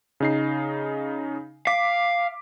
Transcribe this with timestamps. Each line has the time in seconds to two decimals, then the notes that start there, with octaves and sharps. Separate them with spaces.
0.20 C#3 D#4 C7
1.67 F5 D6 B6